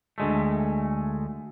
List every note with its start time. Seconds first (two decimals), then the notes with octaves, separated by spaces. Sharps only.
0.18 D2 G#3 A3